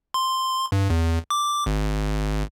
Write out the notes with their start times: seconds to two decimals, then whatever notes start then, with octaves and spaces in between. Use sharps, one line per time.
0.14 C6
0.72 G2
0.90 E2
1.30 D6
1.66 G#1